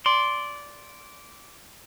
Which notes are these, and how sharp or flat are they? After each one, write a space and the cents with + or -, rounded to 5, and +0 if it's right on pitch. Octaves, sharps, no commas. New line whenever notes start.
D5 -15 C6 +0